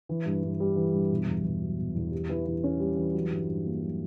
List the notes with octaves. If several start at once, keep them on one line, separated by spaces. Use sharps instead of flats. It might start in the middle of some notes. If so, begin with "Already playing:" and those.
E3
G2
G2
G3
E3
G2
B2
E2
E2
F#3
B2
E2
G3
E3
E3
C#4
G3
E3
F#3
G2
G2
A#3
F#3